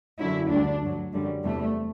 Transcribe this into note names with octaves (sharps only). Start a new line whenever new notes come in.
F#2 D3 F#3 E4
D2 D3 G3 D4
G2 F#3
F#2 D3 G3
E2 C3 G3 A3